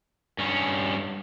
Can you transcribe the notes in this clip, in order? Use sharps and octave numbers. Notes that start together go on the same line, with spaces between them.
G2 C#4